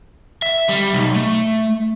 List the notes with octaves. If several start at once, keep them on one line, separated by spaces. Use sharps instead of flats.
E5
G3
B1
A3